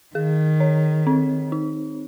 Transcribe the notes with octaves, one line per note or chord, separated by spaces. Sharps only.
D#3 G#4
C#5
C4
D#4